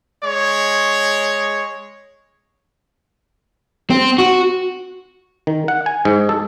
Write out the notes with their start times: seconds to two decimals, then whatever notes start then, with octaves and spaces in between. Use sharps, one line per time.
0.24 G#3 C#5
3.90 C4
4.18 F#4
5.47 D#3
5.68 F#5
5.86 G#5
6.05 G#2
6.29 A4